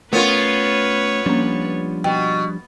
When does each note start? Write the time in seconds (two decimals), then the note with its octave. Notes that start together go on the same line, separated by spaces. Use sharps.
0.13 A3 B3 C#4 F4 A#4 B4 C#5
1.26 F3 G3 A#3 C#4 D4
2.04 B2 G5